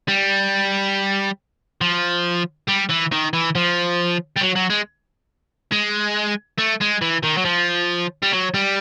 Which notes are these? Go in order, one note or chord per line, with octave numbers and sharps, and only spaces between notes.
G3
F3
G3
E3
D#3
E3
F3
G3
F#3
F#3
G#3
G#3
A3
G#3
E3
D#3
F#3
F3
G3
F#3
G3